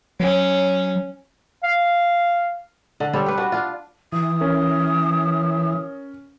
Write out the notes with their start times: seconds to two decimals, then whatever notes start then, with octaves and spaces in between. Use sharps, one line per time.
0.20 F#3 C#4
1.64 F5
3.00 D3
3.13 G3 C4 A4 C#5
3.26 G4 B4
3.37 D4 F#4 B4
3.52 D4 F4
4.12 E3 D#6
4.41 C#4 A#4